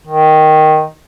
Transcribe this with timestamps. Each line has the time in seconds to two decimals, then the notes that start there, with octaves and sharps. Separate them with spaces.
0.07 D#3